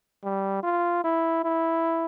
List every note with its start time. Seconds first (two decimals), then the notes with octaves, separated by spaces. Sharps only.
0.24 G3
0.63 F4
1.04 E4
1.44 E4